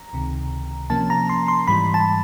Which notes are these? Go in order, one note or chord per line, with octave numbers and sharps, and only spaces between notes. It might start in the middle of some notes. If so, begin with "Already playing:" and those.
Already playing: A#5
C#2 C3 D#3
C3 F3 A#3 C#4 A5
A#5
C6
C6
G#2 E3 G3 B5
A5